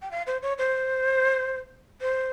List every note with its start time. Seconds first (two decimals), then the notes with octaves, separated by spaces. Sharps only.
0.02 G5
0.11 F5
0.27 C5
0.42 C#5
0.58 C5
2.01 C5